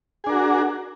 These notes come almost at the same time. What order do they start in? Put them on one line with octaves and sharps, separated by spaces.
G#4 D4 A#4 F#4